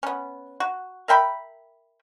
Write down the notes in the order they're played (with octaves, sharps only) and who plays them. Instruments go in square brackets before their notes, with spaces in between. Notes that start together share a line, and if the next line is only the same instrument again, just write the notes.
[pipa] B3 C#4
F#4
A#4 E5 G5 B5